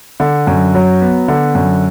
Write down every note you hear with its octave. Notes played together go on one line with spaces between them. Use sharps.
D3
F#2
F#3
B3
D3
F#2